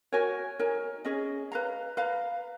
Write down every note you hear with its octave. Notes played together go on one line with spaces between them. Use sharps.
F#4 A#4 C#5 G#5
D#4 A#4 C#5 G#5
C#4 G#4 D#5
B4 F5 A#5
B4 F5 A#5